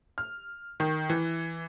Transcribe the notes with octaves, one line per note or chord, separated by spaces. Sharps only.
F6
D#3
E3